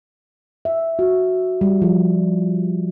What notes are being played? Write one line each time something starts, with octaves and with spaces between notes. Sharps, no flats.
E5
F#4
G3
F3